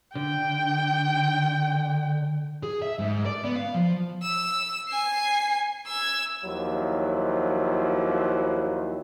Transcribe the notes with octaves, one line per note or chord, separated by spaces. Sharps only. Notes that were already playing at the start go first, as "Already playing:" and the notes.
D3 G5
G#4
E5
G#2
D5
B3
F5
F3
E6
G#5 C7
E6 G#6
D#2 F3 F#3 E4